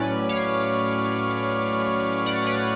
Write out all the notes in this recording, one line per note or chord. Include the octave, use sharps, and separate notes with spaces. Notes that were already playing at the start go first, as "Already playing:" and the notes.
Already playing: A2 F#3 C#4 B4 D5
C#5 F5
D5 F#5
B4 D5